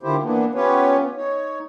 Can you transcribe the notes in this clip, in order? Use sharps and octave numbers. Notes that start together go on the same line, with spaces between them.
D3 D#3 F3 E4 G4 C5
E3 A#3 B3 D4
B3 C#4 F4 G4 B4 C#5
D#4 C#5